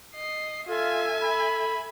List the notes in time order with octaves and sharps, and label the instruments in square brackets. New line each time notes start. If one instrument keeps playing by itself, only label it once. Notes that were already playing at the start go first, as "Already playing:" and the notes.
[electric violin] D#5 C7
[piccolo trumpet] F4 [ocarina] A4 [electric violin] E5 G#5
[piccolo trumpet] B5